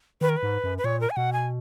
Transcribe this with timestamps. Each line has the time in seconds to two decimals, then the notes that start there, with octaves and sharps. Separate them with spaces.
0.21 D#3 B4
0.29 A#4
0.37 B4
0.43 G#2
0.64 F#2
0.78 B4
0.84 A#2 C#5
1.01 A#4
1.10 G#5
1.16 B2 F#5
1.33 G#5